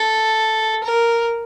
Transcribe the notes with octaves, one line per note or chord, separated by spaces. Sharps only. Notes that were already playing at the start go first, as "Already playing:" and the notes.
Already playing: A4
A#4